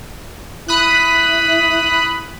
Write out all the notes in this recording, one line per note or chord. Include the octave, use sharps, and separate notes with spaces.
E4 B5 D#6 F#6